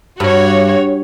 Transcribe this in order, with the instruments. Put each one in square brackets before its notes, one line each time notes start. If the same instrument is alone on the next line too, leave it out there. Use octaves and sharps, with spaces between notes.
[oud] G2 [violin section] F#4 C#5